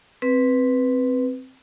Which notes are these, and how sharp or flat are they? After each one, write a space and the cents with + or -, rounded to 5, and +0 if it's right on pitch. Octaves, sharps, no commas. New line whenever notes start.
C4 +0 B4 +0